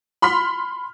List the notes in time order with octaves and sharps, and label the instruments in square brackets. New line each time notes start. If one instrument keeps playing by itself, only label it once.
[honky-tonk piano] B5 C6 F6 B6